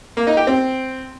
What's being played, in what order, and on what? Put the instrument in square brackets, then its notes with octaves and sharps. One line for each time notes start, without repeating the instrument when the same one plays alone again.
[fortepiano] A#3
D#4
G4
C4